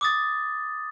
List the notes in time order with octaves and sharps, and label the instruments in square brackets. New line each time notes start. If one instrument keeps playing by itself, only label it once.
[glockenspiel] D6 D#6 A6